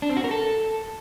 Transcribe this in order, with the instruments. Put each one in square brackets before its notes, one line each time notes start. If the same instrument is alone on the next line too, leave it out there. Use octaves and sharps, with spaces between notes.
[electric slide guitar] D4
C4
F#4
A#4
A4